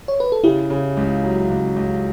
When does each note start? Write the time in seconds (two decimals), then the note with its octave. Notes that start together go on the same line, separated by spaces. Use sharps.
0.08 C#5
0.20 B4
0.32 A4
0.44 C#3 E4 G4
0.70 C#3
0.97 C#2
1.23 F#3
1.50 C#2
1.76 C#2